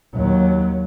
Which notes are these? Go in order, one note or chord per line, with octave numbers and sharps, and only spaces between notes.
D#2 F#3